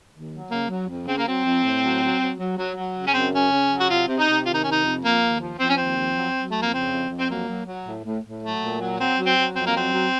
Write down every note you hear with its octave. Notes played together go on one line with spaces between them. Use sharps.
D#2
F#3
C#3 A#3
F#3
F2
C#3 C4
A#3
F#3 C4
F2
A2
F#3
F#3
F#3
F#3
F#3
F#3
C#3
C#4
F#2 C4
C#3 C#4
C#3
F#3
F#4
C3 F4
C3
D#4
C3
D#3 F4
D#4
C3 C#4
D#4
F2
F3 A#3
D#2
F3
F3 C4
C#4
D#2 C4
F3
F#3
F#3
F2 A3
A#3
C#3 C4
F2
F2
C4
F#3 A#3
F#3
F#3
A2
A2
A2
F#3 A3
A#2
F#3
F#3 C4
F#3
C4
F#3
F2 C4
A#3
F#3 C4
F#3